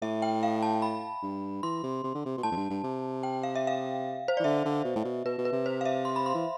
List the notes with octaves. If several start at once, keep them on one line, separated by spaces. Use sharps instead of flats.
A2 E5
G5
F5
A5
B5
G2
E3 C6
C3
C3
D3
C3
B2
A2 A5
F2
G2
G2
C3
G5
F5
E5
F5
C5
E3 D5
D3 E5
D3
B2
A2
B2
B2 B4
B2
B4
C3
C5
F5
E5
C6
B5
C6
E3